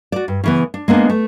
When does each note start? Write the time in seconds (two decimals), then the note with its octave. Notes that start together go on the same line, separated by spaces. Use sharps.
0.12 F#4 D5
0.28 G2
0.44 C#3 E3 B3
0.74 D4
0.88 G#3 A#3 B3 D4
1.10 A3